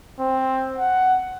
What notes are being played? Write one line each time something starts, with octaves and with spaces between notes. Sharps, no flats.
C4
F#5